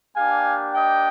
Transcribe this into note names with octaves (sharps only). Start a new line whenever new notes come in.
A#3 D4 G4 F5 G#5
D#5 G5